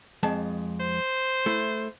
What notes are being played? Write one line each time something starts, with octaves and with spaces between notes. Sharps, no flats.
F2 G#3 A5
C5
A3 E4